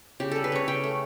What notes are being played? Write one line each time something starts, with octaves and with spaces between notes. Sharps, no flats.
C#3 G4
G3 A4
B4
C#3 C#5
C#3 G5
A3